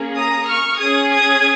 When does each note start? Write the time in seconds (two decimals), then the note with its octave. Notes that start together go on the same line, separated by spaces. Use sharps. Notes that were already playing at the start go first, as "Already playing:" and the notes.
Already playing: A#3 C#4 G#4
0.15 A#5 D#6
0.47 C#6 F6
0.79 C#4 G#4 D#6 G#6
1.10 D#6 G#6